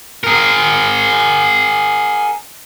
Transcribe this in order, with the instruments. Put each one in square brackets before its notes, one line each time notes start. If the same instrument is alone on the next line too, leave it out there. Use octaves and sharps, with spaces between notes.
[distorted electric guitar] G#4 A#4